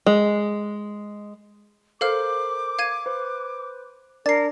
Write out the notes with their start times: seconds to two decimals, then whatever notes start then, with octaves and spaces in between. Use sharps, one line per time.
0.06 G#3
2.01 A4 A#4 C5 F5 D6 F6
2.79 F5 G#6 D#7
3.06 B4 C5
4.26 D4 A#4 D5 A6 C7